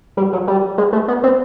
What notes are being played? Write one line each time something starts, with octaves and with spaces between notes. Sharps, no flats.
G3
F#3
G3
G#3
A3
B3
C4